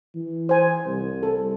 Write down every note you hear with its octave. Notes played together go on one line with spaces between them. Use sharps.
E3
C5 G#5
C2
A4